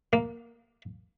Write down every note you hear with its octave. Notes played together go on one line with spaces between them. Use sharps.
A#3